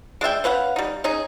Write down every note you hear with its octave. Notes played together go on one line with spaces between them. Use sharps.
G#3 D4 E5 G5
C#4 B4 F5 F#5
G3 D#4
C#4 D#4 G#4